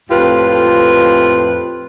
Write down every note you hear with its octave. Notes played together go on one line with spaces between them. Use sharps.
F2 A2 F4 G4 B4